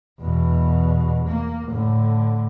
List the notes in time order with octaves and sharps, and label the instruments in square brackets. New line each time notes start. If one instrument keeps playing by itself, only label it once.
[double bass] E2 B2
A#3
A2 D3